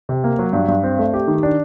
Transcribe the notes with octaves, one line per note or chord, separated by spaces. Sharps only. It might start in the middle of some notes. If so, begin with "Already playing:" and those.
C3
A#3
F#3
G2
G2
C4
A3
G4
D#3
D4